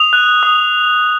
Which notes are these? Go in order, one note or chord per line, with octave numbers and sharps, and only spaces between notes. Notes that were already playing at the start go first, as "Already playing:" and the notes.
Already playing: D#6 F7
F#6
D#6